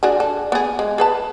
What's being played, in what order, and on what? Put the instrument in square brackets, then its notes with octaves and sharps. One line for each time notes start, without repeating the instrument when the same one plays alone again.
[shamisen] D4 F#4 G#4
A4
B3 G#4
G#3
G#4 B4 A5